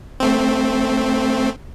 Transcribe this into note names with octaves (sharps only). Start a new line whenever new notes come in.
A3 C4